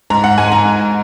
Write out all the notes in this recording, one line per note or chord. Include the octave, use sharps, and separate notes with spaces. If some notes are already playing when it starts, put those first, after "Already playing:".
G#2 A#5
F#5
G#2 G#5
A#5
G#2